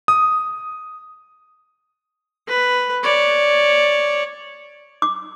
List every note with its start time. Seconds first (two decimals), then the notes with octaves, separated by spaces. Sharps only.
0.08 D#6
2.48 B4
3.03 C#5 D5
5.02 D6